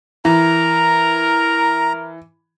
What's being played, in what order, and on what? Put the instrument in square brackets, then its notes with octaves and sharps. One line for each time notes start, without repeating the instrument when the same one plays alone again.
[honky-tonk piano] E3 [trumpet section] A#4 [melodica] A#5